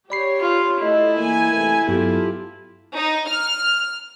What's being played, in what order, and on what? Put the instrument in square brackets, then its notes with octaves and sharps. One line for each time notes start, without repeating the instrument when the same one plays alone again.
[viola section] G4 C#5 [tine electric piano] D5 B5 C7
[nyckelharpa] F4
[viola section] A3 A4 [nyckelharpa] E4 [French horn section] D#5
[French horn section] E3 A#3 [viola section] G#5
[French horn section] C3 E3 A3
[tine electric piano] G2 F#3 B3 [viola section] F4 G4 [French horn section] A4
[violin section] D#4
F6